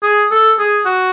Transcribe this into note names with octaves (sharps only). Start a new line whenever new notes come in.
G#4
A4
G#4
F#4